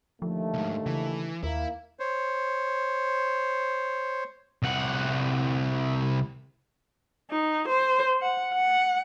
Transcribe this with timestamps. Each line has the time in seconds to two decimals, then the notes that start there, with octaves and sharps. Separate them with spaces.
0.22 D#2 D3 F3 A3
0.54 C2 G#2
0.86 C#3 E3
1.43 D#2 A#3 E4
1.99 C5 C#5
4.63 C2 F#5
7.31 D#4
7.68 C5
8.22 F#5
8.54 F#5